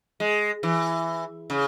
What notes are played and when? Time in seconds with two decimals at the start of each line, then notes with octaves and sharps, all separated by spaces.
0.20 G#3
0.63 E3
1.50 C#3